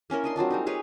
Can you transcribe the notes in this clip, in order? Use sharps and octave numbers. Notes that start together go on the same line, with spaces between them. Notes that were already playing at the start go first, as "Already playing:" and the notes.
A#3 C#4 E4 A#4
D4 D#5 C6
F#3 C4 D4 F4
G3 G#3 D#4
G4 G#4 B4 C#5